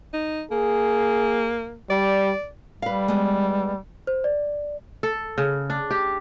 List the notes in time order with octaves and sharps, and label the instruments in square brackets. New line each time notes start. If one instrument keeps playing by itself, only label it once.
[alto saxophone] D#4
[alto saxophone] A#3 [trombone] G#4
[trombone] G3 [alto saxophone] D5
[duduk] G3 [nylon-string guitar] B4 F5
[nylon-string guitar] G#3 B3
[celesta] C5
D5
[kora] A4
C#3
D4
G4